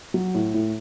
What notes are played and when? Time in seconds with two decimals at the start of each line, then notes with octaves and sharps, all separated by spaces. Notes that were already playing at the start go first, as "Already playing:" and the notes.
0.14 F#3
0.34 A2
0.54 A2